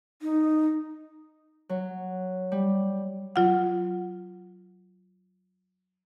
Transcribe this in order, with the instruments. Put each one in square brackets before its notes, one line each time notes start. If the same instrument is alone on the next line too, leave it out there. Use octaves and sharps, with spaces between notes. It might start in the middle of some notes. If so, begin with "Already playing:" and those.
[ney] D#4
[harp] F#3
G3
[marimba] F#3 F4 F#5